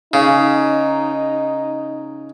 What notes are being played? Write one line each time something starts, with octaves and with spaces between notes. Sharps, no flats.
C#3 D#4